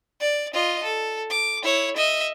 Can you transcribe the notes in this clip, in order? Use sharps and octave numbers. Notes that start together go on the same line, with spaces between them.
D5
F4 D#5
A4
D6
E4 C#5
D#5 E5